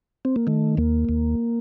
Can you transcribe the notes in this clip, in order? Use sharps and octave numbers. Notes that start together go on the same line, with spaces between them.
C4
A#3
D#3 A3
D#2 A#3
D#2